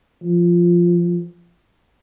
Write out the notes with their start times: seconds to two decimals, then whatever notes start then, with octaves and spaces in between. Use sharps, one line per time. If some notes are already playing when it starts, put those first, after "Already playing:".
0.22 F3